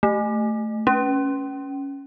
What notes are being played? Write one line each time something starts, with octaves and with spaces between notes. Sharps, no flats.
A3
C#4